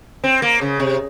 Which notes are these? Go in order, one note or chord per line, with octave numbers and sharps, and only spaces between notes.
C4
A#3
C#3
C3